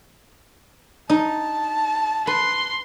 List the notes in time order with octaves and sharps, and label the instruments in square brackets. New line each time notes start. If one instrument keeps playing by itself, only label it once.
[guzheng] D#4 [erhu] A5
[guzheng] B4 [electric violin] C6